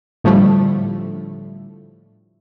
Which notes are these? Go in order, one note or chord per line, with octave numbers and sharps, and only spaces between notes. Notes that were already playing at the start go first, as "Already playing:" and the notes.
A2 D3 F3 G3 A3